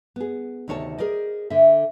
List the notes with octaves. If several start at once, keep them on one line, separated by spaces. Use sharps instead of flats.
B3 G#4
D2 C3 D#3 C#5 D5 A5
G#4 A#4 C5 D5 D#5
D3 E5